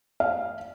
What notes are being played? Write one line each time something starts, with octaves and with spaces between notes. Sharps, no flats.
F5